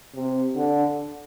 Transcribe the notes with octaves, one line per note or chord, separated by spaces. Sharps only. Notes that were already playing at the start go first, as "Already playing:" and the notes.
C3
D3